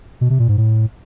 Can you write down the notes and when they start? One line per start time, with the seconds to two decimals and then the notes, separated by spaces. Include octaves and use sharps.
0.21 B2
0.30 C3
0.39 A#2
0.49 G#2
0.58 A2